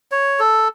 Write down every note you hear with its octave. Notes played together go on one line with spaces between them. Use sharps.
C#5
A4